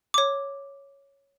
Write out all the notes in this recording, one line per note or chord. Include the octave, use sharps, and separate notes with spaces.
C#5 D6